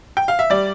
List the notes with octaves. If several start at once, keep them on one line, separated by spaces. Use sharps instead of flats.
G5
F5
E5
G3 D5